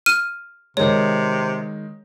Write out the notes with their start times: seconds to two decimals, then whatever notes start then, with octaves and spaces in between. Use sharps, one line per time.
0.06 F6 D#7
0.77 C3 D#3 G#3 C#5